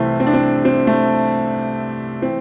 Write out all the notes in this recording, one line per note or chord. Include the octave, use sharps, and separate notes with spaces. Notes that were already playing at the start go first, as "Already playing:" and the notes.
Already playing: C2 C3 E3 A3 C4
C4
D4
C4
C4
A3
E3 C4